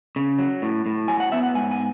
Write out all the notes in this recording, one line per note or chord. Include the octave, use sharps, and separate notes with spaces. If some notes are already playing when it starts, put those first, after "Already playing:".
C#3
F#3
A2
A2
F#3 G#5
F#5
B3 E5
F#5
G#2 G#5
G#5